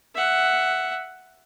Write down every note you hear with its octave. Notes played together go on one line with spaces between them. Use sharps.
E5 F#5